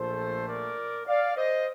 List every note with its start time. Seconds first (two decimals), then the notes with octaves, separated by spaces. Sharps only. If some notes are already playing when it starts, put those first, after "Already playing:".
Already playing: A#1 A#2 A3 A4 C5
0.48 A#4 D5
1.07 D5 F5
1.36 C5 D#5